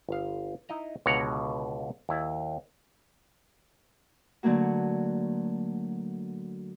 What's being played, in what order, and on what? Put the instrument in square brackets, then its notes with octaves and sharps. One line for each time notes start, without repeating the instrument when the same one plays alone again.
[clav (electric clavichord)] G1 F5
D#4 E4 D#5 A#5
C#2 B2 D3 C#5 F#5 A#5
D#2 E4 A5
[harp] D3 F#3 A3 A#3 F#4